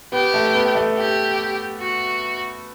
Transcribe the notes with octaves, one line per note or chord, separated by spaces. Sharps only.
B3 G4
A3
B3
A3
G4
F#4